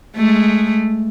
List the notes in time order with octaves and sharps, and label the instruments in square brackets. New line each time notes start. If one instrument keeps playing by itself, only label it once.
[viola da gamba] G#3 A3